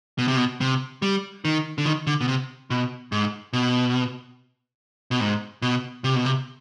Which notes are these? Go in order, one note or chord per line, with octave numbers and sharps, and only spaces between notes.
B2
C3
B2
C3
G3
D#3
D3
D#3
D3
B2
C3
B2
G#2
B2
B2
G#2
B2
C3
B2
C3